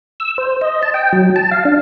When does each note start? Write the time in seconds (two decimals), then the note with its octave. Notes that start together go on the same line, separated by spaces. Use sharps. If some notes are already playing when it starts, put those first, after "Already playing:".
0.20 E6
0.38 C5
0.61 D#5
0.83 A5
0.94 G5
1.13 F#3
1.36 A5
1.51 F5
1.65 D4